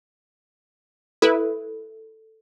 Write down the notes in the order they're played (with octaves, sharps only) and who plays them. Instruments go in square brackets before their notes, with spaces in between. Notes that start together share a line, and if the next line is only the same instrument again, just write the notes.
[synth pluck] E4 B4 [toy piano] A4